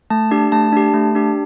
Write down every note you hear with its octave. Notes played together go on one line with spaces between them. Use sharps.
A3 A5
D4 G4
A3 A5
D4 G4
A3
D4 G4